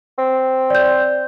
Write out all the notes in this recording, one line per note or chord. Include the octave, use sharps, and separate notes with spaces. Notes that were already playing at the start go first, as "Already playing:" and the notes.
C4
D5 G6